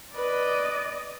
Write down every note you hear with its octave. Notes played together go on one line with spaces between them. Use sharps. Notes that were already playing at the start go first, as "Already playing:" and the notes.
B4 D5 D#5